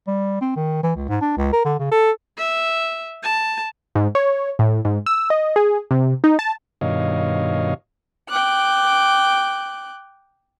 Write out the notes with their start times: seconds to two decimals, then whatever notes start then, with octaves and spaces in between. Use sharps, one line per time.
0.07 G3
0.41 C4
0.56 D#3
0.83 E3
0.96 C#2
1.09 G#2
1.21 D4
1.37 C#2
1.53 A#4
1.65 D3
1.79 C#3
1.92 A4
2.37 E5
3.23 A5
3.95 G#2
4.15 C#5
4.59 A2
4.85 G#2
5.06 E6
5.30 D#5
5.56 G#4
5.91 C3
6.24 D#4
6.39 A5
6.81 G2 B2 D#3 C#5 D#5 F5
8.29 G5 D6 F#6